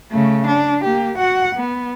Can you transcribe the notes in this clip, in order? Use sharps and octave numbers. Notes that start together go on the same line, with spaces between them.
C#3 A3
D4
A#3 G4
F#4 F#5
B3